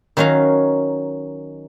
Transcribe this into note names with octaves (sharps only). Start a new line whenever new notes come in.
D#3 F#3 C#4 F#4 F5 A#5